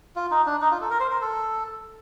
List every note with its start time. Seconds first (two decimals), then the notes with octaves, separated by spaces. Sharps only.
0.16 F4
0.31 D#4
0.46 D4
0.61 D#4
0.71 F4
0.81 A4
0.90 A#4
1.00 C5
1.11 A#4
1.21 A4